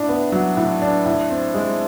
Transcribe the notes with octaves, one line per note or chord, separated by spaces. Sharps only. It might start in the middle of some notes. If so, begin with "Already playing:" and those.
Already playing: A2 D4
B3
F#3
A2
D4
A2
C4
G#3